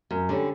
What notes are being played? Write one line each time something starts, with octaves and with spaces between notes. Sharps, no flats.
F#2
D3 G3 C#4